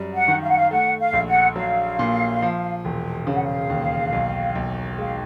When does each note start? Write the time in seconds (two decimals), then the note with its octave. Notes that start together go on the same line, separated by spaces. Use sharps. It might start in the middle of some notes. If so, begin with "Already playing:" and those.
Already playing: F#2 G3
0.14 F#5
0.28 D#3
0.42 F5
0.49 F#5
0.56 F5
0.71 A3 F#5
1.00 F5
1.13 A#1
1.27 F#5
1.56 F#3 F5
1.99 A#2
2.42 F3
2.85 E1
3.27 C#3 F5
3.35 F#5
3.44 F5
3.70 D#2
4.13 B1
4.55 B1
4.98 G#3 F5